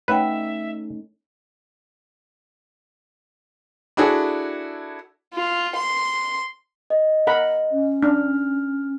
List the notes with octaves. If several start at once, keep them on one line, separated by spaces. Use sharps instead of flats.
A3 C#4 D#4 B4 C#5 E5 F#5 G5
D4 E4 F#4 G#4 A4
F4
C6
D#5
A#4 F#5 B5
C#4
D4 F6